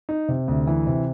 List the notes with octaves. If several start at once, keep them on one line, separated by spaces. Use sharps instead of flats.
D#4
C3
D2
E3
C3